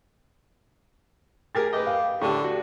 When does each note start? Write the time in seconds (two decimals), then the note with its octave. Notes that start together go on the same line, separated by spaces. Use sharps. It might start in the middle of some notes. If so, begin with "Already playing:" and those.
1.55 G4 G#4 A#4 A6
1.73 G4 B4 D#5
1.87 F5
2.22 A2 D3 G4 A5 C#6
2.44 F#4